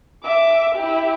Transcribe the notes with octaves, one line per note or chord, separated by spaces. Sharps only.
E5 D6
E4 G4